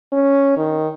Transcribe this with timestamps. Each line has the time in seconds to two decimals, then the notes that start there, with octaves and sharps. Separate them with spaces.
0.12 C#4
0.57 D#3